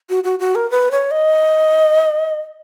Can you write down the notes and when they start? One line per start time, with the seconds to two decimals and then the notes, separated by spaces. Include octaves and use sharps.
0.10 F#4
0.24 F#4
0.39 F#4
0.55 A#4
0.71 B4
0.91 C#5
1.11 D#5